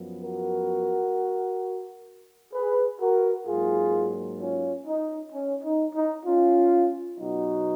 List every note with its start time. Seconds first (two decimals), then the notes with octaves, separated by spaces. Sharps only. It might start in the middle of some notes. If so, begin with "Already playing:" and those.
Already playing: F#2 F3 B3
0.21 F#4 A#4
2.54 G#4 B4
3.00 F#4 A#4
3.47 G#2 F#3 A#3 F4 G#4
4.39 C#4 F4
4.86 D#4
5.32 C#4
5.63 D#4
5.95 D#4
6.26 C#4 F4
7.18 B2 F#3 B3 D#4 F#4